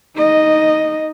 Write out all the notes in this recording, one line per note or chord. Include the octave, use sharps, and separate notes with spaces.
D#4 D#5